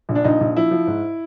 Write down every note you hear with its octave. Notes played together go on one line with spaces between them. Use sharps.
A#1
D4
A#1 D#4
A#1
F3 E4
F3
G#2